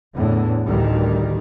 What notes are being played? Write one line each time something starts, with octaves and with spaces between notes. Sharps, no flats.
E2 A2 D3
A1 D2 D#3 G3